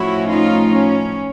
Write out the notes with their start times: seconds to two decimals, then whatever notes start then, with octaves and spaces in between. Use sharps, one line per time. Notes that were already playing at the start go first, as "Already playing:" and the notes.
Already playing: A2 F3 A3 C#4 E4 F#4
0.29 D#4 F4
0.70 C#4